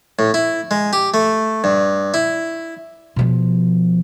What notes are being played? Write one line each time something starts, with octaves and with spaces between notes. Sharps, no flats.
A2
E4
G#3
G4
A3
G2
E4
B2 F3